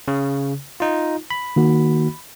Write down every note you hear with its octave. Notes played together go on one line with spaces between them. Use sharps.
C#3
D#4 F4
B5
D#3 A#3 F#4